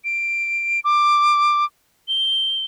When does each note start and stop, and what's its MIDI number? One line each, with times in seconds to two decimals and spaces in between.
0.04 0.80 98
0.84 1.65 86
2.08 2.65 103